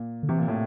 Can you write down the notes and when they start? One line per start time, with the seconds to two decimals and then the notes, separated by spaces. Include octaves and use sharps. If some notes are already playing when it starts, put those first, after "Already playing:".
Already playing: A#2
0.23 D3
0.29 C3 E3
0.38 A#2
0.48 A2